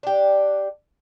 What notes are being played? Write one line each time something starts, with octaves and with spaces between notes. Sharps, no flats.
D4 G4